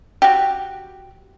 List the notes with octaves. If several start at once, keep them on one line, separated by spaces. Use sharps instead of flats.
F#4 G4